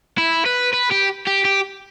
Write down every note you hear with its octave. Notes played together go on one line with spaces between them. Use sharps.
E4
B4
B4
G4
G4
G4